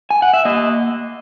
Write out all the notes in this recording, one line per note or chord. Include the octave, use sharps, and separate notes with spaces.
G#5
F#5
E5
A#3 D#5